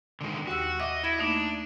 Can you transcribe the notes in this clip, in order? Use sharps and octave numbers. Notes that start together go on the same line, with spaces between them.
D3 D#3 G#3
D#2 F#4 G4 E6
D#5 E5 D6
E4 E5 G#6 A#6
A3 A#3 D4 D#4